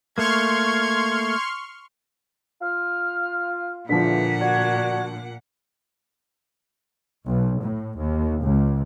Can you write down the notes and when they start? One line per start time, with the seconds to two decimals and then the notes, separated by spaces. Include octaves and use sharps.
0.18 A3 A#3 C6 C#6 F6 G#6
2.62 F4 F6
3.89 E2 A#2 D3 F3 F#5 B6
4.40 D4 F#4 G#6
7.26 B1
7.63 A2
7.98 D#2
8.43 C#2